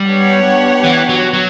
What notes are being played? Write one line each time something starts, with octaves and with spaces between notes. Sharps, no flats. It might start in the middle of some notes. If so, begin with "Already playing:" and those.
Already playing: G3
B3 D4 G4 C#5 F#5
E3
F#3
F#3